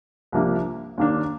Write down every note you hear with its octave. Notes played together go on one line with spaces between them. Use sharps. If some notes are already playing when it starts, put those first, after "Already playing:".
C2 C3 F3 A#3 D4
D#2 D#3 A#3 D4